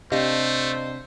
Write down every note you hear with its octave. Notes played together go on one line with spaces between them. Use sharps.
C3 A3 D4 G4 C5 D#5 F5